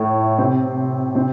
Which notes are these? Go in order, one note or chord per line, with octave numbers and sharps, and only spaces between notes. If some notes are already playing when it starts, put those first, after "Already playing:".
Already playing: A2 A3
C3 C4
C3 C4